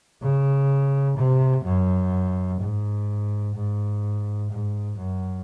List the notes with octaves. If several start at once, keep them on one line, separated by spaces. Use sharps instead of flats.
C#3
C3
F#2
G#2
G#2
G#2
F#2